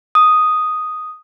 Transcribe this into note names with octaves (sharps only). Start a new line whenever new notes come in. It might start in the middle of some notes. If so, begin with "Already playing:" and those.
D#6